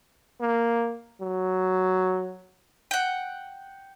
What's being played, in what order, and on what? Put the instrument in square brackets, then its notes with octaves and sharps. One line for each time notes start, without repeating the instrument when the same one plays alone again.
[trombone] A#3
F#3
[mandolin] F#5 G5